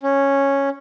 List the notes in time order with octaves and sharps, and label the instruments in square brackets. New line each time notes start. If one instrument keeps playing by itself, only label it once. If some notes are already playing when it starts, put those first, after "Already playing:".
[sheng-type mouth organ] C#4